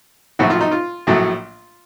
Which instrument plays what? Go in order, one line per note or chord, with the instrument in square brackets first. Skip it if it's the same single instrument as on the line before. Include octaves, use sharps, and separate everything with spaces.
[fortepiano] A#1 A2 F#3 A3 F#4
F4
D#4
F4
A#1 A2 F#3 A3